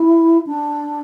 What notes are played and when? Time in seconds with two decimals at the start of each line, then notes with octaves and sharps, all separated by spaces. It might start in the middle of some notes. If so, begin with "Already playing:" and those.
Already playing: E4
0.46 D4